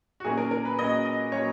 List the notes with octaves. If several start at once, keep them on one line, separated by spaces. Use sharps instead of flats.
F#4
A#2 F#3 A#3 C#4 G#4
A#4
A#4
B4
A#2 F#3 A#3 C#4 D#5
D#5
A#2 F#3 A#3 C#4 C#5